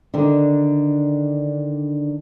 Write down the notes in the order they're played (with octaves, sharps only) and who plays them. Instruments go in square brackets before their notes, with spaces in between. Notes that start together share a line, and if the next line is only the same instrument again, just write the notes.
[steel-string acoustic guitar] D3 D#3 D4